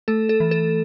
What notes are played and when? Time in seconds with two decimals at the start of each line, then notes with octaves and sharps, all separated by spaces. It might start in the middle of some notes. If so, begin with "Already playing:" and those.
0.08 A3 A4
0.29 A4
0.40 E3
0.51 A4